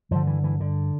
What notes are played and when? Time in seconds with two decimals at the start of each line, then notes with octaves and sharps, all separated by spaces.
0.11 G2 D3 F3
0.27 E3
0.44 E3
0.60 D3